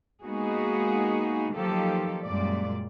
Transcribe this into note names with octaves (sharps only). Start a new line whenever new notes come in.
G#3 A#3 B3 D#4 F#4 G#4
D#3 F3 F#3 A#3 G4 A4
F#2 A#2 G3 G#3 D5